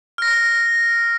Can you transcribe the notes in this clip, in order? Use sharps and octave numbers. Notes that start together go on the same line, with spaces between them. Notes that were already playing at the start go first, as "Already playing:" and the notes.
F6 A#6